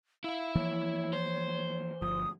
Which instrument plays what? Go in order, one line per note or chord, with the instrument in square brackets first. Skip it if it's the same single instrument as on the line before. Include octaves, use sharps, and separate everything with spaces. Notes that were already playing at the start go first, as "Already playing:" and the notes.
[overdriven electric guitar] E4 E5 [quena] F5
[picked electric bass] E3 F3 A#3 [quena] C#5
[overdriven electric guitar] C5
[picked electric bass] G1 F3 [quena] D#6